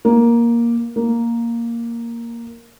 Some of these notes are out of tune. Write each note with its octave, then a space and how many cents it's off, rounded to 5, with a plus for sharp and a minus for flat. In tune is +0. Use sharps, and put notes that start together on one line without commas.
A#3 +10
A#3 +0